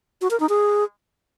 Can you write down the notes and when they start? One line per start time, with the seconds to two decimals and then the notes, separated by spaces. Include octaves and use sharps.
0.21 F#4
0.31 A#4
0.40 D#4
0.49 G#4